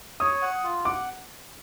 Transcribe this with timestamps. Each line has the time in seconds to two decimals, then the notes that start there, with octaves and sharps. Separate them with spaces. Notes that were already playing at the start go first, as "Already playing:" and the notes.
0.20 C#5 D#6
0.42 F#5
0.64 F4
0.85 F#5 D6